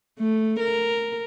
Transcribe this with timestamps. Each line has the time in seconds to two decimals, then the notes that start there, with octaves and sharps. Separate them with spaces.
0.18 A3
0.60 A#4